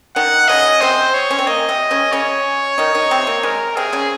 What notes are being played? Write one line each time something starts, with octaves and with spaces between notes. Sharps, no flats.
D#3 D#4 F#5
C#3 C#4 D#5
C3 C4 C5
C#5
C#4
C4
A#3 D#5
C3 C4
C#3 C#4
C#3 C#4 C#5
D#3 D#4
D#3 D#4
C3 C4
A#3
G#3 A#4
C3 C4 G#4
C#3 C#4